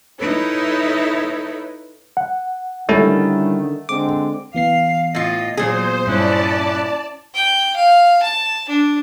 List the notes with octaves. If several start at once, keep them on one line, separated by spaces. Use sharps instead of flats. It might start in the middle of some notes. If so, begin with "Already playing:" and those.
D#4 E4 A4 B4 C#5
F#5
D3 D#3 G3 A3 C#4 E4
D3 G#3 C4 D6
E3 B3 F5 C7
A2 F4 D#5
A#2 F#3 G#4 C5
G2 C#4 E4 D5 A5 F#6
G5
F5
A5
D4